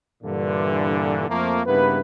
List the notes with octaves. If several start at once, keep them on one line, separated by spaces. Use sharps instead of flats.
G2 A#2 D3 E3
F2 F3 A3 A#3
G2 C#3 A#3 B3 E4 B4